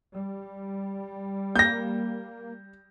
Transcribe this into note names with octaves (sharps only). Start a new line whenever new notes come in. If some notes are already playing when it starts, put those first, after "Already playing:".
G3
A#3 G6 A#6